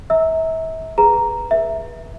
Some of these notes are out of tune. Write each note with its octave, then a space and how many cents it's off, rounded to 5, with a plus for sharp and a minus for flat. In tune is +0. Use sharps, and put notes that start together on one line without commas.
E5 -35 A#5 -10 E6 -10
G#4 +0 B4 +0 A#5 +0
B4 -30 E5 +0